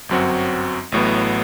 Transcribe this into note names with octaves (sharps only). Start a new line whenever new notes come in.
G1 F#2 F#3 C4 F#4
A1 A2 F#3 B3